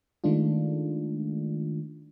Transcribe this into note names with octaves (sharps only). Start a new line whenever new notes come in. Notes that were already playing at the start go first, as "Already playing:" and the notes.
D#3 G#3 A3 D4 F4